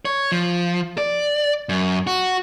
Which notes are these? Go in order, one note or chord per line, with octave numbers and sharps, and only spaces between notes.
C#5
F3
D5
F#2
F#4